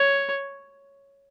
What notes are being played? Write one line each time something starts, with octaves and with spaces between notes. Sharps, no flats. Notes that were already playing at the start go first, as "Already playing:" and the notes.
Already playing: C#5